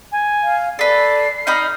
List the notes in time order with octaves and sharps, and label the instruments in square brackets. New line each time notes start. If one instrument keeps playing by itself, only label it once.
[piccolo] G#5
[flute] F5
[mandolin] A4 B4 [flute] D5 [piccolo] C7
[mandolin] D#4 D#5 B5 [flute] F6